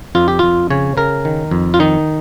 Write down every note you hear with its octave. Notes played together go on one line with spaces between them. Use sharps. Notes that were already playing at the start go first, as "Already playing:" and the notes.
F2 F4
G4
F2 F4
C#3 C#5
C#3 A#4
D#3
F2
F4
D#3 D#4